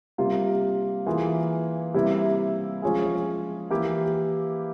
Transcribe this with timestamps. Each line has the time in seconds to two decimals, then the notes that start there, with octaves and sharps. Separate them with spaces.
0.18 C3 G3 A#3 F4
1.06 E3 A#3 F4 G#4
1.94 C3 G3 A#3 E4
2.82 F3 G#3 C#4 F4 G#4
3.70 E3 A#3 E4 G4